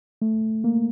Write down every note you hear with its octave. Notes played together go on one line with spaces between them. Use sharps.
A3
A#3